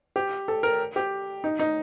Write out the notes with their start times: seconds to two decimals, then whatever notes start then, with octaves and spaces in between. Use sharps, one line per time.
0.16 G4
0.48 A4
0.63 A#4
0.96 G4
1.44 D#4
1.59 D#4